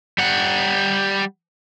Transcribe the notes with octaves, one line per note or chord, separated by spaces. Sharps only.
G3 F#5